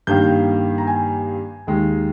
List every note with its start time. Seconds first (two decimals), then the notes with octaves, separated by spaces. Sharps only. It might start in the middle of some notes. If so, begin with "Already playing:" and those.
0.07 G2 D#3 A#3 G6
0.78 A#5
0.87 G#5
1.67 D#2 D#3 G#3